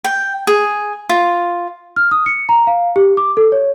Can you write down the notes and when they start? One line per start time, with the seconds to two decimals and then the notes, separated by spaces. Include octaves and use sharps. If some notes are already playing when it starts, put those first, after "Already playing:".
0.04 G5
0.47 G#4
1.09 F4
1.96 F6
2.11 D#6
2.26 C#7
2.49 A#5
2.67 F5
2.96 G4
3.17 D6
3.37 A4
3.52 C#5